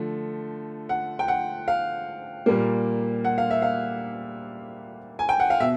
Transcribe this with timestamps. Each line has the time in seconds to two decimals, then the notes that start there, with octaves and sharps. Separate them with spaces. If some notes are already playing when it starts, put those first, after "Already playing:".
Already playing: D3 F3 A3
0.89 F#5
1.19 G5
1.28 F#5
1.68 F5
2.46 A#2 G3 A#3
3.25 F#5
3.38 F5
3.51 E5
3.62 F5
5.19 G#5
5.29 G5
5.40 F#5
5.50 F5
5.60 B2 E5